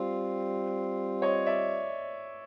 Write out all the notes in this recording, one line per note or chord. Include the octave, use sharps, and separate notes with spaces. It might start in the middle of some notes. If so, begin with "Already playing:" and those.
Already playing: G3 C4 F4
C#5 D#5
D5 E5